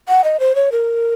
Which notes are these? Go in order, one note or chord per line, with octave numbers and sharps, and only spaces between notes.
F#5
D#5
C5
C#5
A#4